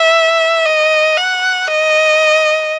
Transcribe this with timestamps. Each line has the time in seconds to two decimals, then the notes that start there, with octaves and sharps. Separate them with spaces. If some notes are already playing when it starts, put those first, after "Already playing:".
Already playing: E5
0.66 D#5
1.17 F#5
1.68 D#5